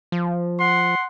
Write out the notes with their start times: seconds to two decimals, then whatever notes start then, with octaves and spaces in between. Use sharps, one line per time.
0.12 F3
0.59 F#5 C6